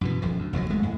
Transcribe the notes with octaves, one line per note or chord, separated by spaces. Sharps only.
F#2 B2 E3
D#1 F#2 F3
D2
F1 D#2 F3 F#3
D1 G#3 A3
F2 A2